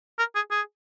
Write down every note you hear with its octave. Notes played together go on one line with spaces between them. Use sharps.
A#4
G#4
G#4